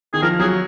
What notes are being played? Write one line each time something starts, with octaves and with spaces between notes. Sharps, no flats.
D#3 G#4
F3 A#4
F#3 G#4